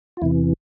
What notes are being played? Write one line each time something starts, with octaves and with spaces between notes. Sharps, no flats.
F4
E2 C3 E3 E4